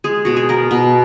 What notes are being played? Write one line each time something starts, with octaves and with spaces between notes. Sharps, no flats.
G#3 G#4
B2 F#4
G#4
B3 A#4
B2